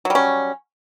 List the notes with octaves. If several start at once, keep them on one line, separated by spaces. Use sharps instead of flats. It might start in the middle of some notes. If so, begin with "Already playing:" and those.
F#3 G3 C#4